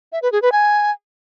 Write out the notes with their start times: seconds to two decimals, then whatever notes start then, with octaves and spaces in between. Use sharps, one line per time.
0.12 E5
0.22 B4
0.32 G#4
0.42 B4
0.52 G#5